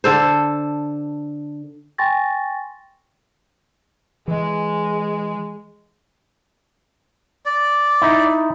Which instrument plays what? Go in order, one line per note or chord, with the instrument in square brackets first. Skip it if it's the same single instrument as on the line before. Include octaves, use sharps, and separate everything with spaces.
[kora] D3 A4 C5
[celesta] G5 G#5 C6 C#6 A6 A#6
[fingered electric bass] E3 [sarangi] G#3
[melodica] D5
[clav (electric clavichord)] D#4 E4